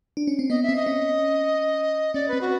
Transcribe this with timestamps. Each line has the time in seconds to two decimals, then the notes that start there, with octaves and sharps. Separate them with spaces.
0.17 D4
0.27 C#4
0.39 C4
0.50 B3 D#5
0.63 E5
0.69 C4
0.76 D#5
0.86 C#4
2.14 C#4 D5
2.28 C4 B4
2.41 F#4